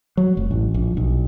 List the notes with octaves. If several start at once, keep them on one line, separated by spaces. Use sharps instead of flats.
F#3
F1
A1
A#1
B1